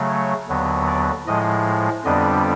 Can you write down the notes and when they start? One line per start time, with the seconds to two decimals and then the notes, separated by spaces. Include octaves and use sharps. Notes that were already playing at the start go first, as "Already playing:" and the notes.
Already playing: C#3 F#3 A3
0.09 C#5
0.48 D#2 D3 F#3 B3
0.87 D5
1.27 A2 F3 G#3 D#5
2.05 F2 D3 G3 B3 D4 D#5